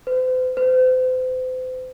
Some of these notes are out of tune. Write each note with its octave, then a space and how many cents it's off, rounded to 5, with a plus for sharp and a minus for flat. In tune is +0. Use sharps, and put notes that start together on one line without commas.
C5 -45
C5 -40